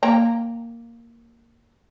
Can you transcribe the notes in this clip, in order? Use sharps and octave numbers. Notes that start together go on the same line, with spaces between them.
A#3 G5 A#5